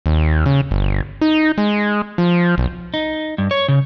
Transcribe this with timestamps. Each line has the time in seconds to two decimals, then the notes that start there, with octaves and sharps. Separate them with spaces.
0.06 D#2
0.46 C#3
0.71 G1
1.21 D#4
1.58 G#3
2.18 F3
2.58 B1
2.94 D#4
3.38 G2
3.51 C#5
3.68 C#3